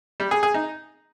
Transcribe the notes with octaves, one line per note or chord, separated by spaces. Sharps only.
G3
G#4
G#4
D#4